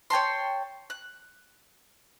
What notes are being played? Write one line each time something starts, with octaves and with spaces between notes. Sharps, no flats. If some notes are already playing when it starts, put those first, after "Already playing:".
C#5 G5 A5 C6
F#6